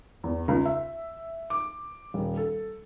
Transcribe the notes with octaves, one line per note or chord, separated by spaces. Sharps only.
E2
C#2
E5
D6
D#1
A4